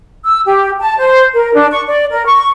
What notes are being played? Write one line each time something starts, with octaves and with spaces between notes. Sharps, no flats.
E6
G4
A5
C5
A#4
D4
C#6
D5
A#4
C#6